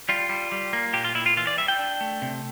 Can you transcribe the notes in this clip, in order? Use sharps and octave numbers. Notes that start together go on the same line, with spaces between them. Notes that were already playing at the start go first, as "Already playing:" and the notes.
G3 F4
G3
G3
A#3
A#2 G4
F4
A#2 E4
F4
E3 F4
D5
G3 E5
G5
D4
A3
C3